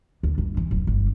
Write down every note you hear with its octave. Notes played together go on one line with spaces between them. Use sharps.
D2
G1
E3
D1
G1